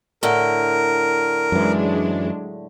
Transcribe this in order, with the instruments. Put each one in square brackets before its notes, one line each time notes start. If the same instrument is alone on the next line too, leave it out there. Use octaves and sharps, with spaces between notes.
[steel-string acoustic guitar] A2 D3 [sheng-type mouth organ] A#4
[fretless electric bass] F#2 E3 [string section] F#3 G#3 D4